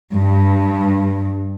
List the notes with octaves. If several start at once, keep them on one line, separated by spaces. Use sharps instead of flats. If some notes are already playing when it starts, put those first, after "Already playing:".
G2